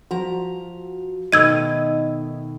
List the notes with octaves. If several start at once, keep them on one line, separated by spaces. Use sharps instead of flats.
F3 F#4 A#5
B2 D#3 A3 D#4 D#5 E6 G#6 D#7